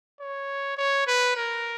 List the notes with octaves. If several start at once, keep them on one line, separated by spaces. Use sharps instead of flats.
C#5
C#5
B4
A#4